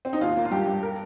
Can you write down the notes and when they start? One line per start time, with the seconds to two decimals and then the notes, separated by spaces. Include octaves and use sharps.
0.05 C4
0.13 D#4
0.21 D#2 F4
0.37 A#3
0.45 F4
0.51 G2 G4
0.67 G2
0.83 A#4